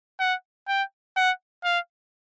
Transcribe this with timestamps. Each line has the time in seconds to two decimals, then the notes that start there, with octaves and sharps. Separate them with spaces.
0.20 F#5
0.68 G5
1.17 F#5
1.64 F5